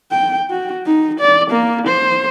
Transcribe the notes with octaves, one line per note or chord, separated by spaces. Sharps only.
G5
F#4
D#4
D5
A#3
C5